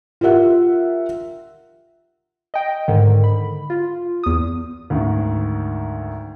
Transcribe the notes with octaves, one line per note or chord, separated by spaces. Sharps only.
F4 G4 A#4 E5 F#5
D#5 G5
G#2 D3 D#3
B5
F4
E2 D#6
D2 G#2 D#3